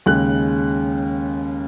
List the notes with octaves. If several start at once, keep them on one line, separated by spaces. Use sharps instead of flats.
D#2 C#3 G#3 F#6